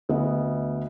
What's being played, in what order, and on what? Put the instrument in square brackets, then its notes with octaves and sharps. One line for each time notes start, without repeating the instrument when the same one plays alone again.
[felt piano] D2 B3 D#5